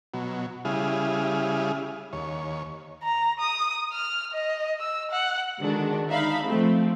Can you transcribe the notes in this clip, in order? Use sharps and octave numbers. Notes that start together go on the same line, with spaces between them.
B2 F#3
C#3 G3 E4 G#4 D#6 F6
D#2 C#5
A#5
D#6
F6
D#5
E6
F#5
D3 D#3 G#3 D4 F#4
D#4 E5 F5 B5
F3 A3 C4